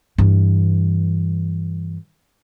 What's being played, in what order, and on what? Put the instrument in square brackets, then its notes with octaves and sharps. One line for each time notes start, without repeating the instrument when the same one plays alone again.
[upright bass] G2 E3